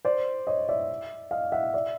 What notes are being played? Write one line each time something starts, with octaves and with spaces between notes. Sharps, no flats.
C5 D5
C#5 D#5
D5 E5
D#5 F5
E5 F#5
D5 E5